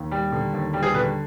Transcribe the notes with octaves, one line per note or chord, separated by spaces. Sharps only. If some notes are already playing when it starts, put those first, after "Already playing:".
Already playing: D#2
G3
D3
D#2
G3
G#4
D3 B4